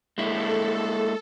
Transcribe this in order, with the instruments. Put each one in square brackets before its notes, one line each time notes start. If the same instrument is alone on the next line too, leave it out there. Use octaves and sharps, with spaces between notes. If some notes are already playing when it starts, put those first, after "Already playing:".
[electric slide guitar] G#3 A#3 E4 [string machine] A4